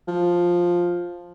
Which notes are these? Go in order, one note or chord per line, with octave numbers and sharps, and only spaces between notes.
F3